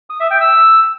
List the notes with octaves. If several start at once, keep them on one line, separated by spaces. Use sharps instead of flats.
D#6
E5
G5
E6